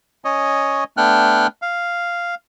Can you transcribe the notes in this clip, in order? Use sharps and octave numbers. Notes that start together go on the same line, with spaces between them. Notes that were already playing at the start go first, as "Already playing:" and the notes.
C#4 C#5 D#5
A3 B3 D4 G5 F6 F#6
F5